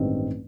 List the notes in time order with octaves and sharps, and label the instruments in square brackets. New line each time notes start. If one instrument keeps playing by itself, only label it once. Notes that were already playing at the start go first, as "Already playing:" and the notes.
Already playing: [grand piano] A1 G2 D#3 G#3 C4